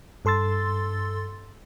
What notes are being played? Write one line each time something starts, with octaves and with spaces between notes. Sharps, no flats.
G2 A4 C6 E6 A6